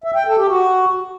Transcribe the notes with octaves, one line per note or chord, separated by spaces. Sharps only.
E5
G5
A4
G4
F#4